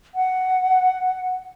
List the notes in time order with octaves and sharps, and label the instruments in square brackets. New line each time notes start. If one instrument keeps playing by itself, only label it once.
[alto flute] F#5